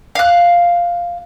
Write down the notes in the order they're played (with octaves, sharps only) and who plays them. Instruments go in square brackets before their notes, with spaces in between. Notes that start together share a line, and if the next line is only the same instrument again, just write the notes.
[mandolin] F5 F#6